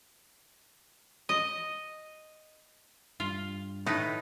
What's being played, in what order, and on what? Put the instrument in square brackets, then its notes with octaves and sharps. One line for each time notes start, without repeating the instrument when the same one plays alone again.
[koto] D#5
[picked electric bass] G2 [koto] F4
[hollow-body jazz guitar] A2 D#3 [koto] D#4 B4